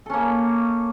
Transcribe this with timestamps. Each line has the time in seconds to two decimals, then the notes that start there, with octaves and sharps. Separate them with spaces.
0.06 A4
0.10 C#4
0.14 A#3